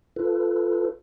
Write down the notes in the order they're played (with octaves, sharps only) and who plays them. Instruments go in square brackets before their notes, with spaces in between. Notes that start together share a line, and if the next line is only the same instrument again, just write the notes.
[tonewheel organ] F4 A4 B4